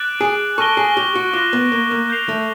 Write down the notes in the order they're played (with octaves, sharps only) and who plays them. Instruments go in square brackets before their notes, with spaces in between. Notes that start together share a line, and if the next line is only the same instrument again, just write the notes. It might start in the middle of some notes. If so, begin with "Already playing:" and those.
Already playing: [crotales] D6 F#6 A6 D7 F#7
[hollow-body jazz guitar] G#4
[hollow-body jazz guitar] A4 [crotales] C#6 F6 A#6 D#7 G7
[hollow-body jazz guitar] G#4
G4
F#4
[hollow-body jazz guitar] F4 [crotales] D6 F#6 A#6
[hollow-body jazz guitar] B3
A#3
A#3
[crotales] G6 C7 F7
[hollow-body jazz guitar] A3